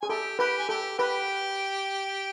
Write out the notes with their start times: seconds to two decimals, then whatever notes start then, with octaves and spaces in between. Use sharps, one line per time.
0.02 G#4 G#5
0.09 G4 A4 G5
0.39 G4 B4 G5
0.59 G#5
0.69 G4 A4 G5
0.98 G4 B4 G5